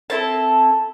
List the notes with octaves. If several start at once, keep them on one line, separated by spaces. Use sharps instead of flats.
C4 E4 A4 A5